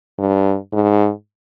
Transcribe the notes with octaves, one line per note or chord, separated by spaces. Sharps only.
G2
G#2